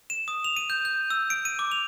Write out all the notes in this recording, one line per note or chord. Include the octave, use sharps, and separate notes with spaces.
E7
D#6
F7
D#7
G6
G6
E6
D7
D#7
D6
F7